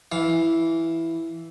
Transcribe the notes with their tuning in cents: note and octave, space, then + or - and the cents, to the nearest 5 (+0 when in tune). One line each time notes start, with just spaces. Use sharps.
E3 +0 F5 +15